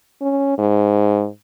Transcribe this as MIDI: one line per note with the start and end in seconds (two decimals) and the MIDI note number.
0.22 0.54 61
0.59 1.27 44